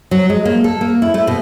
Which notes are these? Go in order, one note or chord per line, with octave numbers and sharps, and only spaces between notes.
F#3
G#3
A#3
A4
A#3
E4
A3
B2